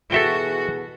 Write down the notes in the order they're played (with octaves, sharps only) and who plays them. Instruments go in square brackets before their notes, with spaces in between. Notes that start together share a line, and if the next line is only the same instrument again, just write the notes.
[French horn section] B2 E3 G#4 [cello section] F#4 [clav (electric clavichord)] A4 E5 G5